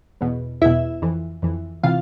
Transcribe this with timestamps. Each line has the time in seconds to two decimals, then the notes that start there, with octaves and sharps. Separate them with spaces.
0.21 E2 B2
0.62 E2 B2 E4 E5
1.02 F2 E3
1.42 F2 E3
1.83 C3 E3 F4 F5